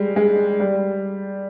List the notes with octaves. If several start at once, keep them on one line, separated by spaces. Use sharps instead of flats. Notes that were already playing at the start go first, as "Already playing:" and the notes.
Already playing: G3 G#3
G#3
G3